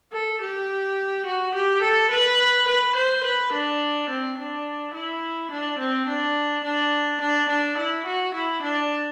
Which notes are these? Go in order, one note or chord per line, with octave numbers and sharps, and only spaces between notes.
A4
G4
F#4
G4
A4
B4
B4
C5
B4
D4
C4
D4
E4
D4
C4
D4
D4
D4
D4
E4
F#4
E4
D4